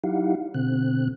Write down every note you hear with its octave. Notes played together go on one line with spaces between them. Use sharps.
F#3 D#4 E4 G4 F5 F#5
B2 D3 C4 F#6